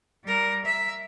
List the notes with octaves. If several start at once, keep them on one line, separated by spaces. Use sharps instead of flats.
G3 A#4
E5